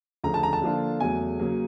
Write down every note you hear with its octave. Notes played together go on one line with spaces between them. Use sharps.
D2 C#3 F3 A#5
A5
A#5
A5
D3 F3 A#3 D4 F4
E2 C#3 F#3 A3 G#5
C#3 F#3 A#3